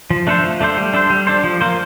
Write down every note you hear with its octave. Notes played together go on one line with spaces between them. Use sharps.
F3
A3 D4 A4 C5
F3
A3 D4 A4 C5
G3
D4 A4 C5
G3
D4 A4 C5
F3
A#3 F4 C5